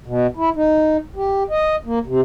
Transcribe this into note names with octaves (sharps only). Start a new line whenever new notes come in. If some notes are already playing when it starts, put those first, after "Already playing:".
B2
E4
D#4
G4
D#5
A#3
C3